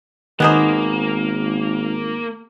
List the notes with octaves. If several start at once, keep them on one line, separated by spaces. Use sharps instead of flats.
G#1 D#3 A#3 B3 D#4 G#4 C5